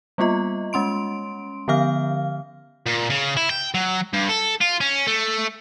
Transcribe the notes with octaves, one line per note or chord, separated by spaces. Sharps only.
G3 A#3 B3 F4 D#5
G#3 C#4 C6 D7
D3 F3 B3 F5 F6
A#2
C#3
E4
G5
F#3
G2
A4
F4
C#4
A3